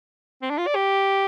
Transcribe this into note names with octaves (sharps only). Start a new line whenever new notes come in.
C4
D4
F4
D5
G4